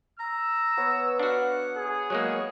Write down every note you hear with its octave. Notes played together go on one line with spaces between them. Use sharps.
A#5 E6
B3 C#5
D4 F#4 F5 F#5
G#4
F#3 G#3 A#3 C#5